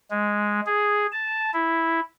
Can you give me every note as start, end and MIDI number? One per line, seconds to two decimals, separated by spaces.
0.11 0.61 56
0.66 1.07 68
1.12 1.51 81
1.53 2.00 64